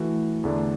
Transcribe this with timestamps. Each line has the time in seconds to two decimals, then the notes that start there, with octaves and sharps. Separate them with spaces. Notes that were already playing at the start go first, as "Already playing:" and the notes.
Already playing: E3 A3 F#4
0.44 E2 D3 A3 D4